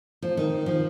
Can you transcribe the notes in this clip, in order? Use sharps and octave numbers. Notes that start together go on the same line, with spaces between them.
F3
D#3
F3